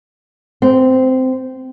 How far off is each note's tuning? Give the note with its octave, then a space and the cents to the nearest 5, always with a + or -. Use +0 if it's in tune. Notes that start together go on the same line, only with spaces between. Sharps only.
C4 -15